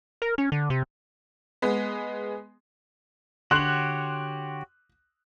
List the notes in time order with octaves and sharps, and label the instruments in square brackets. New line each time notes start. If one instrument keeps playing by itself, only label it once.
[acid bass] A#4
C#4
D3
C3
[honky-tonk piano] G#3 B3
[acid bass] D3 [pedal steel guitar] F#4 G4 C#5 [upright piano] C6 [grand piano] F#6 F#7